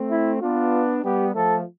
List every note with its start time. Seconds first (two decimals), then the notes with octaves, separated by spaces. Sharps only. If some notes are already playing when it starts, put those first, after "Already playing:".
Already playing: A3 C4
0.11 E4
0.41 B3 D4 F4
1.04 G3 B3 G4
1.35 F3 A3 A4